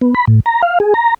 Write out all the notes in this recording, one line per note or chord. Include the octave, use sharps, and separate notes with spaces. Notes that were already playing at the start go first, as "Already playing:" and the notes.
B3
B5
A2
A#5
F5
G#4
A#5